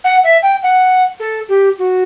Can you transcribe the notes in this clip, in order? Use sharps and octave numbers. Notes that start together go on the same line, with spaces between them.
F#5
E5
G5
F#5
A4
G4
F#4